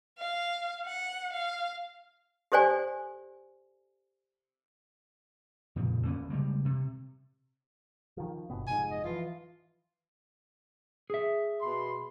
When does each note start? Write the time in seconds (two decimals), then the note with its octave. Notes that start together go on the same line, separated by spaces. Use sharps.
0.19 F5
0.85 F#5
1.33 F5
2.52 G4 A4 C5 D5 G#5
5.76 F2 A#2 C#3
6.05 D3 A#3 B3 C#4
6.30 C#3 G3 G#3 A#3
6.65 C3
8.17 D#3 F3
8.50 G1 B2 B3
8.67 F1 G#2 G#5
8.91 D#5
9.04 E3 F3 F4
11.10 G#4 E5
11.61 B2 B5 C6